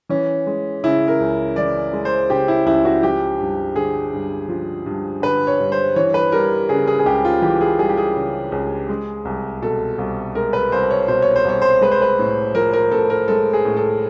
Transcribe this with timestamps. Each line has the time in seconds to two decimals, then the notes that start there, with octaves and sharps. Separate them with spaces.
0.09 E3 C#4
0.47 G#3
0.84 C#3 E4
1.08 A#4
1.20 C#2
1.56 E3 D5
1.93 G#3
2.05 C5
2.30 C#3 G4
2.48 E4
2.66 C#2 E4
2.85 F#4
3.02 F3 G4
3.39 G2
3.76 D3 G#4
4.13 G2
4.49 F3
4.86 G2
5.22 D3 B4
5.47 C#5
5.60 G2
5.72 C5
5.96 E3 C#5
6.14 B4
6.32 G3 A#4
6.69 C#3 G#4
6.87 G#4
6.99 G#4
7.06 C#2 G4
7.25 F4
7.42 E3 G4
7.61 G#4
7.79 G3 G#4
7.89 G4
7.97 G#4
8.15 C#3
8.52 C#2
8.89 G#3
9.25 C2
9.62 B2 A4
9.98 C2
10.35 G#3 A#4
10.53 B4
10.72 C2 C5
10.91 C#5
11.08 B2 C5
11.22 C#5
11.36 C5
11.45 C2 C#5
11.62 C5
11.81 G#3 B4
11.91 C5
12.02 B4
12.19 A2
12.55 F3 A#4
12.73 A#4
12.91 A2 A4
13.10 A#4
13.28 G#3 A4
13.53 G#4
13.65 A2
13.77 A4